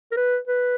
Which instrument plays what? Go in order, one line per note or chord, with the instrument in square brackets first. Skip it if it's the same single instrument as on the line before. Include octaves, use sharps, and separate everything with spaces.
[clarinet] A#4
B4
B4